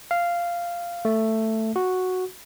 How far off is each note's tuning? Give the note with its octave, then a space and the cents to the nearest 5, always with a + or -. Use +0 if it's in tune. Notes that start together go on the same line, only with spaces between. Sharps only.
F5 -10
A3 +10
F#4 -5